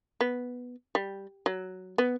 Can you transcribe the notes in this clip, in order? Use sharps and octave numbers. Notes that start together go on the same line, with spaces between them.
B3
G3
F#3
B3